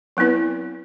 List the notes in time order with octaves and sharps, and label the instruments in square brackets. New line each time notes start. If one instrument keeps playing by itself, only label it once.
[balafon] F#3 B3 C4 E4 B4